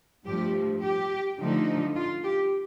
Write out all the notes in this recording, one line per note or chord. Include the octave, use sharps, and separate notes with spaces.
G2 F3 A3 G4
G4
D3 F3 A3 D#4
F4
G4